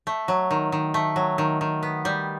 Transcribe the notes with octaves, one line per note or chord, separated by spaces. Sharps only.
A3
F#3
D#3
D#3
A3
F#3
D#3
D#3
B3
G3